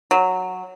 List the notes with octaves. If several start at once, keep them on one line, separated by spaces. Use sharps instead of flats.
F#3